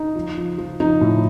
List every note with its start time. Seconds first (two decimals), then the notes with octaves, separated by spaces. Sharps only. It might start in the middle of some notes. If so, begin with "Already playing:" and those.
Already playing: D#4
0.15 F3
0.37 F3
0.58 F3
0.80 F3 D#4
1.01 A2